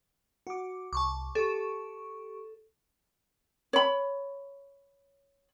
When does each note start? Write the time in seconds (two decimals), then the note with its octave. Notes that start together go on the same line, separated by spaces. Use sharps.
0.47 F#4 D6
0.93 C2 A5 C#6 D6
1.35 G4 A4 C#6
3.73 C#5 B5